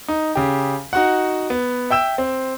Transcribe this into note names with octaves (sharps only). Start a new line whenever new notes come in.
D#4
C#3 G4
D#4 F#4 F#5
B3
E5 G5 E6 E7
C4